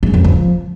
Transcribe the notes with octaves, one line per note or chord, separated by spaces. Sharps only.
G#2
F2
F3